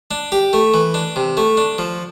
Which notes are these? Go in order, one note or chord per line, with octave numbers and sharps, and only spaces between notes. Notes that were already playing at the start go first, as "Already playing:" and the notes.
D4
G4
A3
E3
D4
C3
A3
D4
F3